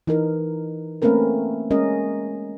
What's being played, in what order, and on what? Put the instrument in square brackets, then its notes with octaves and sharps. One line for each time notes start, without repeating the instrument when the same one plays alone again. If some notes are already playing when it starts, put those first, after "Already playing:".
[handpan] E3 D#4 A#4
A3 A#3 C4 C#4 A#4 B4
G#3 C#4 A#4 D#5